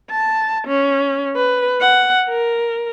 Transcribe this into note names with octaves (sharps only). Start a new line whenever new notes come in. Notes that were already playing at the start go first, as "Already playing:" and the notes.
A5
C#4
B4
F#5
A#4